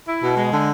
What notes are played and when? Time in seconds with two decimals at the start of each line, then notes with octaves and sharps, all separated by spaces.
0.08 E4
0.22 B2
0.37 G#3
0.51 D3